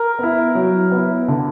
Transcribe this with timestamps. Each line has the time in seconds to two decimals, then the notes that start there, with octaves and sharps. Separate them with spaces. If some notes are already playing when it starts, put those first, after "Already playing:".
Already playing: A#4
0.19 B3 E4
0.55 F#3
0.91 B3 E4
1.28 D3